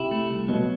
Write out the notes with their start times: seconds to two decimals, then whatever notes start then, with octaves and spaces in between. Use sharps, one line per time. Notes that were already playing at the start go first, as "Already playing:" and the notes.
Already playing: C3 E4
0.11 A3
0.31 C2
0.48 B2 F#3